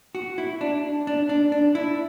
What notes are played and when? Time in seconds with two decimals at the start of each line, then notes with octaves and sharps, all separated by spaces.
0.15 F#4
0.38 E4
0.61 D4
1.07 D4
1.29 D4
1.52 D4
1.75 E4